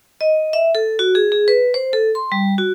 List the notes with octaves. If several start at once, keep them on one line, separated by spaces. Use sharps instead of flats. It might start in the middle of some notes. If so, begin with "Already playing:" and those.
D#5
E5
A4
F#4
G#4
G#4
B4
C5
A4
C6
G3
F#4